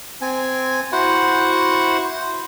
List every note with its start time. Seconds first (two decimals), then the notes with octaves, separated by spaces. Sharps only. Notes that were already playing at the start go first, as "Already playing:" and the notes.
0.21 C4 G#5
0.92 E4 F#4 C5 F#5